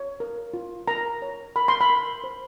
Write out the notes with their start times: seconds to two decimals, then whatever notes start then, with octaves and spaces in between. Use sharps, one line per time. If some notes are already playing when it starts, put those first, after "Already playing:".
Already playing: C#5
0.20 A#4
0.54 F4
0.88 A#4 A#5
1.22 C#5
1.56 A#4 B5
1.68 C6
1.81 B5
1.90 A#4
2.24 C5